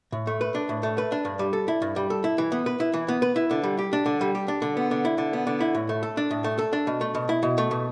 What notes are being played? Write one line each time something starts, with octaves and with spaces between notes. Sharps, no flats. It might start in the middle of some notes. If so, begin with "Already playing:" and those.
A2
A3
B4
D4
A2
A3
B4
D4
G2
G3
A4
E4
G2
G3
A4
E4
E3
B3
B4
E4
E3
B3
B4
E4
D3
G3
G4
D4
D3
G3
G4
D4
D3
B3
D3
E4
D3
B3
D3
E4
A2
A3
A4
D4
A2
A3
A4
D4
B2
A3
B2
E4
B2
A3
B2